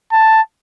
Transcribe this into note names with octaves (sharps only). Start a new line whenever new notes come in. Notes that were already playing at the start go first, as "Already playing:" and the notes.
A5